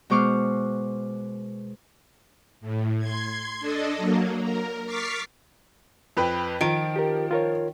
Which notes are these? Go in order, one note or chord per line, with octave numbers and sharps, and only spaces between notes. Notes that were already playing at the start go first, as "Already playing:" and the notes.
B2 G#3 C5 C#6 D6 F6
A2
C6 G#6
D4 A4 D#5
F#3 A#3
A#4
C#6 D6 F6 A6 B6 C7
F2 B4 G5
D#3 F3 D7
G4 A#4
F4 A#4 C#5